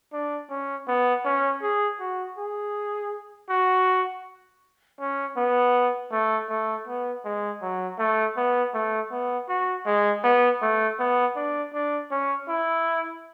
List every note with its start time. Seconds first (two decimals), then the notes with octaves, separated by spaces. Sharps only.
0.13 D4
0.50 C#4
0.88 B3
1.25 C#4
1.62 G#4
2.00 F#4
2.38 G#4
3.50 F#4
5.00 C#4
5.37 B3
6.12 A3
6.50 A3
6.87 B3
7.25 G#3
7.62 F#3
7.99 A3
8.37 B3
8.74 A3
9.12 B3
9.49 F#4
9.86 G#3
10.24 B3
10.62 A3
10.99 B3
11.36 D4
11.74 D4
12.11 C#4
12.49 E4